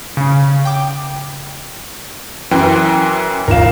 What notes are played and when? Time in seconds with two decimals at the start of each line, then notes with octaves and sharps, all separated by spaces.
0.17 C#3
0.65 G5 D6
2.51 F#2 E3 G5
3.48 G#1 F3 A#4 F5 E7